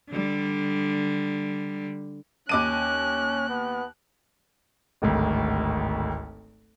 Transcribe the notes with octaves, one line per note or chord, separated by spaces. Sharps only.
D3 G3
D#2 C#4 D6 F#6 D#7
B3
D1 G#1 D2